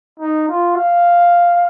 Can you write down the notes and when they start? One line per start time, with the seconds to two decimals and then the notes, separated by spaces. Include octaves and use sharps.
0.20 D#4
0.49 F4
0.76 F5